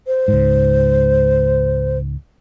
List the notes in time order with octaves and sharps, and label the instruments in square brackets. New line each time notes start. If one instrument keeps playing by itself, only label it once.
[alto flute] C5
[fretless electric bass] C#2 G#2